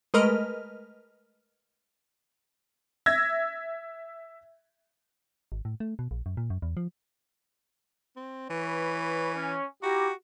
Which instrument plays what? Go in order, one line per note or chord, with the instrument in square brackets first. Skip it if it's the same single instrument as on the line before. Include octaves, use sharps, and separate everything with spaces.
[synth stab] G#3 A3 A#4 B4 D#5 F6
[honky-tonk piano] E5 E6 G#6 A#6
[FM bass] G#1
A2
A3
B2
A#1
F#2
A#2
F#2
E2
F3
[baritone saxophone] C4
[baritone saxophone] E3 [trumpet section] B4 C#5
[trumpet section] C#4
[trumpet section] E4 A#5 D6 [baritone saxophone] F#4 [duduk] G4